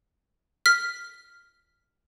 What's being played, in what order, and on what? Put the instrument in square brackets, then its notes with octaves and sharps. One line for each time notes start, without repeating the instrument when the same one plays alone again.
[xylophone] F6 B6